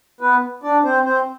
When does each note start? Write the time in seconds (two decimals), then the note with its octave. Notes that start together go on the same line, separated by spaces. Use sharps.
0.21 B3 B4
0.63 D4 D5
0.84 C4 C5
1.05 C4 C5